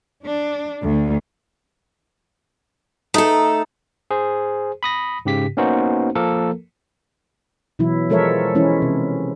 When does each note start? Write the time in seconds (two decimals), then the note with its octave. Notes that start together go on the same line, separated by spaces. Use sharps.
0.24 D4
0.83 D2
3.14 A3 D#4 A4
4.11 G#4 C5
4.83 B5 D#6 A#6
5.25 G#2 C#3 G4 B6
5.57 A#3 B3 C#4 D#4 F#4 C5
6.15 F3 A#3 A4 A#4
7.79 B2 E3 F#3 E4
8.10 F3 G#3 A4 A#4 C#5 E5
8.55 E3 G#3 C#4 E4
8.82 C3